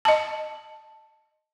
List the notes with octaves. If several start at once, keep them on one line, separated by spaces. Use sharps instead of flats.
D#5 A5